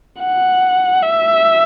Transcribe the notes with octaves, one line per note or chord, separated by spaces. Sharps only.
F#5
E5